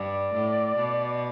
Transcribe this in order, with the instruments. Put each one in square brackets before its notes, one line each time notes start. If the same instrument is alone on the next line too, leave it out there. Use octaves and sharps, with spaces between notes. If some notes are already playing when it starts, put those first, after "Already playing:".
Already playing: [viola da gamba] G2 [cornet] D5
[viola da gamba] A2
B2